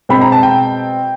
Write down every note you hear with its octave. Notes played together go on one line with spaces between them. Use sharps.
B2 G#3 C4 B5
A#5
A5
G5